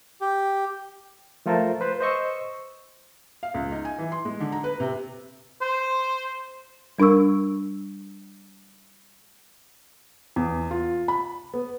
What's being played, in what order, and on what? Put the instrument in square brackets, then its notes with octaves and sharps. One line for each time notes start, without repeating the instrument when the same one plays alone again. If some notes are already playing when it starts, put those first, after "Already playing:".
[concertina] G4
[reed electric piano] F3 A3 F4 A4 A#4 C5
B4 C5 B5
C5 D#5 C#6 E6
[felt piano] F5
C#2
D#4
G#5
E3
C6
G#3
D3
A#5
B4
C3
[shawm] C5
[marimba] G3 D4 A#4 C#6 E6
[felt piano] E2
F4
B5
B3